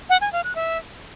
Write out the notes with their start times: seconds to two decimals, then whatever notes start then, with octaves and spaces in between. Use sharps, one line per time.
0.09 F#5
0.21 G#5
0.32 F5
0.44 F#6
0.55 E5